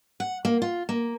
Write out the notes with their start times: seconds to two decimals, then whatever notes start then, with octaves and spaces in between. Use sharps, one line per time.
0.20 F#5
0.45 A#3
0.62 F4
0.89 A#3